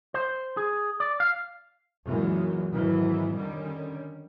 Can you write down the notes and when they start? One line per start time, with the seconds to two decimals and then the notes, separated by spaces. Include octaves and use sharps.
0.14 C5
0.57 G#4
1.00 D5
1.20 F5
2.05 F#2 A#2 E3 G#3
2.72 F2 G#2 D#3 E3 F#3
3.34 D3 D#3 G3 C#4